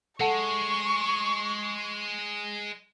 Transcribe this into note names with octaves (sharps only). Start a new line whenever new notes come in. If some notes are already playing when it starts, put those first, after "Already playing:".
G#3 A4 F#5 A5 C#6